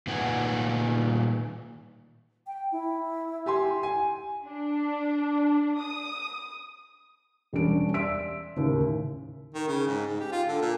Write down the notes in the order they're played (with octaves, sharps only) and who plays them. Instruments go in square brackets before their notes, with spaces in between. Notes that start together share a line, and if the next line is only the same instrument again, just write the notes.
[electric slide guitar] A#2 D#3 B4 F#5 G#5
[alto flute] G5
E4
[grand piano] G4 G#5 C6
G#5
[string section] D4
D#6
[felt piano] E1 G3 C#4 D4 D7
D5 E5 C6 E6 B6 D7
D#2 A2 C#3
[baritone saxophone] D#3
C#3
G#2
G#2
G4
F4
D3
A#2